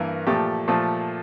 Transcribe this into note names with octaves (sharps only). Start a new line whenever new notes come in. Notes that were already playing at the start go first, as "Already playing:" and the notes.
Already playing: G2 E3 A#3 A#4
A#2 F3 A3 G4
A#2 F3 A3